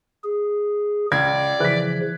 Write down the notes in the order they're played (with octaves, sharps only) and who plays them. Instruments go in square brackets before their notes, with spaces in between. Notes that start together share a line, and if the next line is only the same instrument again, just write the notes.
[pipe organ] G#4
[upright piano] C#2 G#6 [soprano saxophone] D5
[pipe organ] C#3 F3 [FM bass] E3 [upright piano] F#6 B6